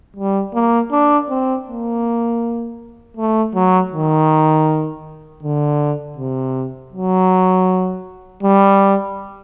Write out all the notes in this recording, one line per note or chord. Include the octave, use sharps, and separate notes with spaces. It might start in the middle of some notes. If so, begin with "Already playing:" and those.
G3
A#3
D4
C4
A#3
A3
F#3
D#3
D3
C3
F#3
G3